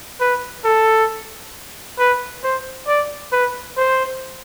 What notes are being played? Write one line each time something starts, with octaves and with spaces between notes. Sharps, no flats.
B4
A4
B4
C5
D5
B4
C5